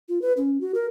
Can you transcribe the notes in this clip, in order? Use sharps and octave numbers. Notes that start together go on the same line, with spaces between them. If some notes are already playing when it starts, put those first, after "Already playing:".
F4
B4
C#4
F#4
A#4